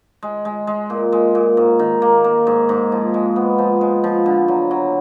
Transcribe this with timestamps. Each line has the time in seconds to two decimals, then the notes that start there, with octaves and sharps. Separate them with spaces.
0.23 G#3
0.45 G#3
0.67 G#3
0.90 A#2
1.12 G#3
1.35 A#2
1.57 G#2
1.79 D#3
2.02 A#3
2.24 A#3
2.47 G#2
2.69 G#2
2.92 F3
3.14 G#3
3.36 B3
3.58 F3
3.81 G#3
4.04 F3
4.26 D3
4.48 F#3
4.71 F#3